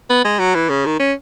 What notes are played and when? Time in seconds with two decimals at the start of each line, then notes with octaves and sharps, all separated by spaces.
0.10 B3
0.25 G#3
0.39 F#3
0.55 E3
0.69 C#3
0.86 D#3
1.00 C#4